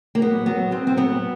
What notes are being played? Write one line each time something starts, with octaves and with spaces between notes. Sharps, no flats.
A#3
F#3 B3
F#3 B3
F#3 C4
C4
F#3 B3